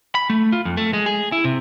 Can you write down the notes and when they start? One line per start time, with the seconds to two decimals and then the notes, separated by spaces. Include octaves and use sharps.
0.15 B5
0.30 A3
0.52 F4
0.65 F2
0.77 A3
0.93 G#3
1.06 G#4
1.32 E4
1.44 C3